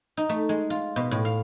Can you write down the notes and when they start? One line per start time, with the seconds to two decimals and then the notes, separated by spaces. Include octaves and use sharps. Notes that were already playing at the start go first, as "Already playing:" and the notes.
0.17 D#4
0.29 A3
0.49 G#3
0.70 F4
0.96 B2
1.11 A2
1.25 F5